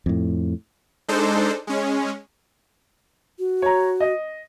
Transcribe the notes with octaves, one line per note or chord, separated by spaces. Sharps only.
F2 A2
G#3 D4 D#4 A4 C5
G#3 C#4
F#4
C#5 A#5
D#5